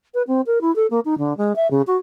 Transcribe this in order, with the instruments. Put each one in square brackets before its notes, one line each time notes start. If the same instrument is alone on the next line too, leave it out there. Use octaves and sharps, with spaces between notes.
[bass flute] B4
C4
A#4
E4
A4
A#3
D#4
D3
G#3
E5
C#3
F#4